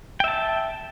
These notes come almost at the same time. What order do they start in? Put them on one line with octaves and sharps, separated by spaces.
G5 E5 A5